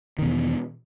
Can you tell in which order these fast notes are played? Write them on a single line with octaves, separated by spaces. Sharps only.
D#3 B2 E2